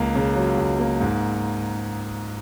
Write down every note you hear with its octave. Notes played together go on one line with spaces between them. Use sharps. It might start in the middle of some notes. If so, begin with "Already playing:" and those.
Already playing: C#2 A#3
C#3
F#3
C#2
A#3
G#2